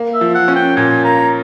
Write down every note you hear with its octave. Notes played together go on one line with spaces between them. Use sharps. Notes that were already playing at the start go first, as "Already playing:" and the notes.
Already playing: A#3
E5
F3
F#5
C#4
G5
A#2 G#5
A#3 A#5